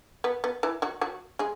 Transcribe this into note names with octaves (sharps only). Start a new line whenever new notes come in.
B3
B3
E3 E4
F#3 F#4
F#3 F#4
G#3 G#4